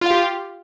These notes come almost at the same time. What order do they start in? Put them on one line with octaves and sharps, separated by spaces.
F4 F5 G4